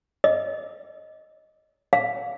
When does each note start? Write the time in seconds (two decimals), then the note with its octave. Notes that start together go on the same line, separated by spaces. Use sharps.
0.24 D#5
1.93 F5